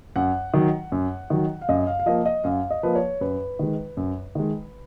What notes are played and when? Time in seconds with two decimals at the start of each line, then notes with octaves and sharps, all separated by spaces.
0.16 F#2 F#5
0.54 D#3 F#3
0.92 F#2
1.30 D#3 F#3
1.62 F5
1.69 F#2 D#5
1.87 F5
2.00 F5
2.06 F3 A#3 D#5
2.26 D#5
2.44 F#2 F5
2.71 D#5
2.83 F3 A#3 B4
2.95 C#5
3.21 F#2 B4
3.59 D#3 G#3
3.97 F#2
4.35 D#3 G#3